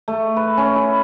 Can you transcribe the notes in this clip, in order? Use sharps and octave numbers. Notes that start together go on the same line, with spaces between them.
A3
B4
C#4
E4